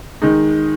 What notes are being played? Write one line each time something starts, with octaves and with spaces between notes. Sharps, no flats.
D#3 G#3 D#4